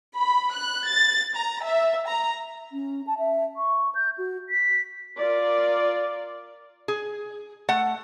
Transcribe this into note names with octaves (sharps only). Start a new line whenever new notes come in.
B5
F#6
A6
A#5
E5
A#5
C#4
A5
E5
C#6
G6
F#4
B6
F4 A#4 D5
G#4
A3 F#5